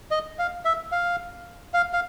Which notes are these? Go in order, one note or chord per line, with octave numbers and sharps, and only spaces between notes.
D#5
F5
E5
F5
F5
F5